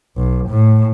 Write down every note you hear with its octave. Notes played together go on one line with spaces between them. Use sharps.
B1
A2